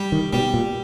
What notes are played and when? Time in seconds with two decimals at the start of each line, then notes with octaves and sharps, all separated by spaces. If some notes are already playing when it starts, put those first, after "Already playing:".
Already playing: G3
0.12 D#3
0.33 B2 G3
0.54 A#2